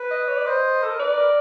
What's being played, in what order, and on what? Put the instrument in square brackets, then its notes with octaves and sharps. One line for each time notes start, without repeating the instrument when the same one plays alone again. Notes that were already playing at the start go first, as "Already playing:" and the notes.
Already playing: [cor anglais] B4
[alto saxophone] D#5
C#5
D5
[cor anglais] C5 [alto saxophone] D#5
[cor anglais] A4
A#4
[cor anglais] B4 [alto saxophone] D5
[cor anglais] A#4